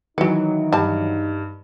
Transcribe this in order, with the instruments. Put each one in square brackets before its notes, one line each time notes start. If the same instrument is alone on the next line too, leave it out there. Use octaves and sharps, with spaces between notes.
[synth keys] D#3 E3 F#3 [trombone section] D#4 [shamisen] F#4 B4 [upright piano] C#7 D7
[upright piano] G2 [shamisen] G3 A5